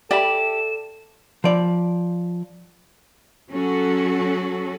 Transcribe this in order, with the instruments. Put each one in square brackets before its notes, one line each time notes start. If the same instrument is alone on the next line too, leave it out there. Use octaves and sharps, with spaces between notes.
[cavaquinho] G4 [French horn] A4 [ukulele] D5 E5 B5 [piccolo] E7
[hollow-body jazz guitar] F3 D5
[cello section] F#3 C#4 F#4 A4